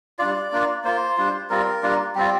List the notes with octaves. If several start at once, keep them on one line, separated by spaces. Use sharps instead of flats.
G3 D4 F4 D5
A#3 D4 F4
A#3 F4 C5
G3 D4 F4
G3 C4 F4 A#4
G3 A#3 D4 F4
G3 C4 F4 G4